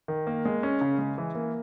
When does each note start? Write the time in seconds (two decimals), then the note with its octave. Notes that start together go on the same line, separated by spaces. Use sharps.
0.08 D#3
0.27 A#3
0.45 G#3
0.63 C#4
0.81 C#3
0.99 G#3
1.18 E3
1.35 A#3